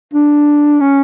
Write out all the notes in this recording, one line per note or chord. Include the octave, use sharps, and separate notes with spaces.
D4
C#4